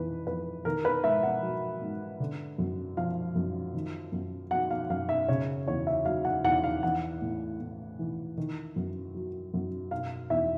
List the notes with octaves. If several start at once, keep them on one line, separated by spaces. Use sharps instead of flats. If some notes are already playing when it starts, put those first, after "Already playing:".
Already playing: F2 E3 B4
F2 B4
D#3 A#4
B4
G#2 E5
F#5
F#3
G#2
D3
F#2
F3 F5
F#2
D#3
F#2
F#3 F#5
F5
F#2 F5
E5
C#3 C#5
E2 C#5
E5
F#3 F5
F#5
E2 F#5
F5
E3 F#5
A2
A2
E3
D#3
F#2
F#3
F#2
B2 F5
E2 E5